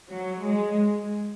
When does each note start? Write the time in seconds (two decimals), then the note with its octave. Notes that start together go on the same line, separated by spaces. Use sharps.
0.10 F#3
0.43 G#3